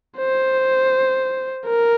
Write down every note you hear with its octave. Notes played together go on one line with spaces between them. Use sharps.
C5
A#4